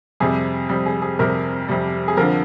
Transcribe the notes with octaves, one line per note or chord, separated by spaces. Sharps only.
F2 C3 G3 G#4
F2 C3 G3 G4
G#4
G#4
F2 C3 G3 A#4
F2 C3 G3
G#4
F2 D3 F3 A#4